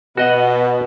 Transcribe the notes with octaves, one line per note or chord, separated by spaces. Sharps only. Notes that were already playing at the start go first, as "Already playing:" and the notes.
B2 B3 F#4 D#5 F#5